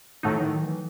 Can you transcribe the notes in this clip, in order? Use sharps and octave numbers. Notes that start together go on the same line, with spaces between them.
A2 D#3 F#3 A3 D#4
E3
D#3
E3